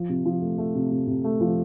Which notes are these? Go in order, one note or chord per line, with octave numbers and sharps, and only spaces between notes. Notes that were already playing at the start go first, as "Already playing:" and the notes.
Already playing: F3
C3
F3
A3
A3
C3
C3
C3
A3
F3